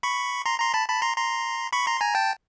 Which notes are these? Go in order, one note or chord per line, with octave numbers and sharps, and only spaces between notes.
B5 C#6
A#5 C6
A#5 C6
A5 B5
A5 B5
A#5 C6
A#5 C6
B5 C#6
A#5 C6
G#5 A#5
G5 A5